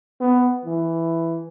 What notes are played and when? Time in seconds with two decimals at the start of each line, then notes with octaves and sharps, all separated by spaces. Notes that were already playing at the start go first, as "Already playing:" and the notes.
0.21 B3
0.65 E3